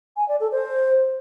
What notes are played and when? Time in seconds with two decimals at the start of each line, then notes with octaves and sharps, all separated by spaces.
0.17 G#5
0.28 D5
0.40 A4
0.52 C5